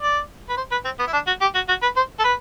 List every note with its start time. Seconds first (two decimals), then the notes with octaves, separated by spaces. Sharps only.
0.01 D5
0.49 B4
0.57 C5
0.71 B4
0.85 C4
0.99 B3
1.07 E4
1.13 D4
1.27 F#4
1.41 G4
1.55 F#4
1.68 F#4
1.82 B4
1.96 C5
2.19 A4
2.24 B4